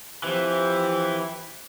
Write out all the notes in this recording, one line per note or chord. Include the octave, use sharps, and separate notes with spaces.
E3 F3 C4 G4